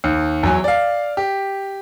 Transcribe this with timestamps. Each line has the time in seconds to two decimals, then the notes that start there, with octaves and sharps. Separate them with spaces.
0.04 D#2
0.43 E2 F#3 G#5
0.64 D5 F5
1.17 G4